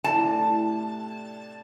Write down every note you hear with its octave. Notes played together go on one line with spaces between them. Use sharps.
A2 C3 D4 A5